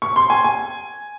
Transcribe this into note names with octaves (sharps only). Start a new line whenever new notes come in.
C#6
C6
G#5
G#5